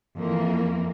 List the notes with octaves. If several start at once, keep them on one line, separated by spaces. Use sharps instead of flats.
F2 E3 A#3